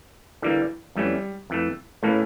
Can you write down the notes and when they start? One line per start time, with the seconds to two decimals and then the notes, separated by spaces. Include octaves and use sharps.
0.42 D3 E3 G3 A#3
0.96 F2 E3 G3 A3 C#4
1.50 F2 E3 A3
2.03 A2 E3 A3 A#3 C#4